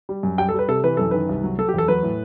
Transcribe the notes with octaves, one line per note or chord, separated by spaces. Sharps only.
G3
F#2
G3 G5
A4
G3 B4
C3 A4
E3 B4
F#2 A4
D#3 B4
C2
F#3
F#3 A4
G4
E2 A4
F#3 B4
A2